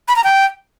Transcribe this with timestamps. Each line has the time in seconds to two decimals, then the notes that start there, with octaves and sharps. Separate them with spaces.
0.08 B5
0.16 A#5
0.24 G5